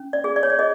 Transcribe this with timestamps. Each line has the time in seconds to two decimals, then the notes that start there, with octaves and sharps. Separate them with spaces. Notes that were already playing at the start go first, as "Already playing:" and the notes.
Already playing: C#4
0.13 D5
0.24 G#4
0.36 D5
0.43 C#5
0.50 D5
0.59 G#4 D#5